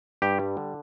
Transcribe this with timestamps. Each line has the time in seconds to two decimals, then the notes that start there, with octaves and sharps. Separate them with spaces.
0.22 G2 G4
0.39 G3
0.57 D3